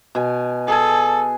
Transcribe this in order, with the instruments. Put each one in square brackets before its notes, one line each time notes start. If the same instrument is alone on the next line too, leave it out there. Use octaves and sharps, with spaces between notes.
[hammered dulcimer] B2 G#5
[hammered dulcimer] G#4 G#5 [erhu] A4